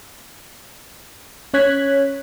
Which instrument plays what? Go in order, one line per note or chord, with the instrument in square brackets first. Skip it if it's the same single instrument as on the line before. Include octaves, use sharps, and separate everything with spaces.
[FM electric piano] C#4 C#5 F#6 G#6 B6